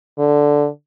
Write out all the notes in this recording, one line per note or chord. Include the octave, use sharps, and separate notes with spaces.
D3